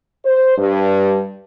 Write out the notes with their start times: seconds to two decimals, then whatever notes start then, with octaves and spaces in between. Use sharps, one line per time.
0.24 C5
0.57 G2